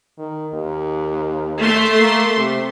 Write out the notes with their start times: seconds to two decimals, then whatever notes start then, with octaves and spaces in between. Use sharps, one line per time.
0.18 D#3
0.54 D#2
1.58 A3 C6
1.99 A#3
2.37 C3